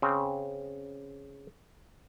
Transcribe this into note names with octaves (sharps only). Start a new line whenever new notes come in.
C#3 C4